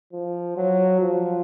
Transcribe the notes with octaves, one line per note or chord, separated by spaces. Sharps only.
F3
F#3
F3